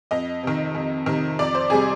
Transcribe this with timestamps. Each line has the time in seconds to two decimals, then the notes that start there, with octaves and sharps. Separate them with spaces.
0.11 F2 D#5
0.43 C3 D#3
0.75 F2
1.06 C3 D#3
1.39 F2 D5
1.55 C5
1.70 C3 G3 G#4